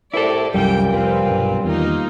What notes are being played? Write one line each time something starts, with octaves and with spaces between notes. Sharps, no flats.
C2 E4 A4 D5
C2 F#2 A#2 E3 G3 G5
F1 C4 F4 B4
B1 G2
E2 D#3 A#3 D#4 F4